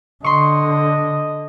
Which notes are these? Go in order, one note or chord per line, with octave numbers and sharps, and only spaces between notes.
D3 D#5 C6 C#6